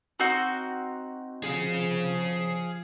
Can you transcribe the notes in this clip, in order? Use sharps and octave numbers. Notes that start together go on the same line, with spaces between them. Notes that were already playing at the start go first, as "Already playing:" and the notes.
C4 D#4 F#4
F3 G#4 F5